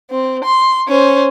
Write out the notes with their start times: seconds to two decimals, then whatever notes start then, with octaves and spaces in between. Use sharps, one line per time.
0.10 C4
0.45 C6
0.88 C#4 C5